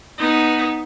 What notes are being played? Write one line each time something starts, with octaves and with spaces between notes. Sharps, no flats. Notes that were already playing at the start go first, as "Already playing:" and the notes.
B3 D#4